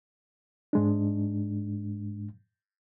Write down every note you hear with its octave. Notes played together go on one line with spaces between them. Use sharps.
G#2 G#3 D4